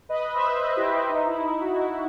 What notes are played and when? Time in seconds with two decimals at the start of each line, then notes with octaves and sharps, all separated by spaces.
0.09 B4 D#5
0.34 C5 E5
0.59 B4 D#5
0.76 E4 G4
0.93 E4
1.09 D#4
1.27 E4
1.43 E4
1.60 D#4 F#4
1.77 E4
1.94 E4